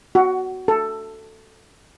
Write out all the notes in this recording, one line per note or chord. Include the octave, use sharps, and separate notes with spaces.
F#4
A4